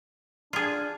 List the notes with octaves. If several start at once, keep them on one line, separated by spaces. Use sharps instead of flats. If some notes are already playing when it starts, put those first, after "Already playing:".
D4 F4 G#4